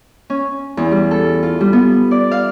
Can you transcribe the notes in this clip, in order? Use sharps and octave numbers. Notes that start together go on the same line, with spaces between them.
C#4
E2
G3
A4
F4
G3
B3
D5
F5